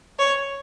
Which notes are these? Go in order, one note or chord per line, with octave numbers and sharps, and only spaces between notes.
C#5